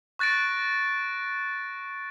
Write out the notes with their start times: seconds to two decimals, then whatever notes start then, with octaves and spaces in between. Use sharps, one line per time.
0.19 C#6 F#6 A6 A#6 D7